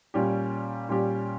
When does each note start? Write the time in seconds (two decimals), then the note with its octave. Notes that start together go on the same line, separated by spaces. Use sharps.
0.14 A#2 G3 C#4 G4
0.89 A#2 G3 C#4 G4